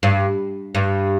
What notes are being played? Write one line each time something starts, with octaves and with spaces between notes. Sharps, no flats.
G2
G2